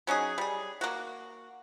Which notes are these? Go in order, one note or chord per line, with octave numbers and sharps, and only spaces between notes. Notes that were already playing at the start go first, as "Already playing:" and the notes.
F#3 C#4 D#4 G#4
G3 G#4
A#3 F#4